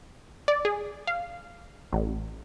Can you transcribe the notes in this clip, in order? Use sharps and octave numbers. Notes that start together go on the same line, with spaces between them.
D5
G#4
F5
A1